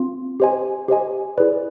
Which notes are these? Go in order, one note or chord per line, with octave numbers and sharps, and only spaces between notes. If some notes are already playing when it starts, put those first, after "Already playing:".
Already playing: C4 F4
G4 C5 D#5 G#5
G4 C5 D#5 G#5
E4 G#4 B4 D5